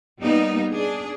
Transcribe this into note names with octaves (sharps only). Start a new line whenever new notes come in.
G3 A#3 B3 D#4
D4 G#4